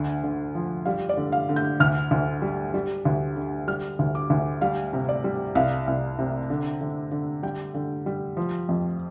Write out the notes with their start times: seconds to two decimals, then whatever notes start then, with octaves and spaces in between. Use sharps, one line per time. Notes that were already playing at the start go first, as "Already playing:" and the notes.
Already playing: D2 D3
0.23 D3
0.55 F3
0.85 G3 F5
1.09 D5
1.17 D3
1.32 F5
1.49 D3
1.56 G6
1.80 D2 F6
2.11 D2
2.42 G3
2.74 G3
3.05 D2
3.36 D3
3.68 G3 F6
3.99 D2
4.15 D6
4.30 D2
4.61 G3 F5
4.93 C3
5.09 D5
5.24 G3
5.55 C2 F5
5.87 C2
6.19 C3
6.50 D3
6.81 D3
7.12 D3
7.43 G3 G5
7.74 D3
8.06 G3
8.37 F3
8.69 F2